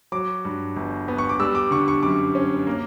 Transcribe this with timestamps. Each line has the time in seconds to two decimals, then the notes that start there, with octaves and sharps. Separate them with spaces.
0.12 F#3 D6
0.45 G2
0.76 G1
1.08 B3
1.18 C#6
1.29 D6
1.40 G3 E6
1.55 D6
1.71 D3 C#6
1.88 C#6
2.03 F#2 D6
2.35 C#4
2.67 A#3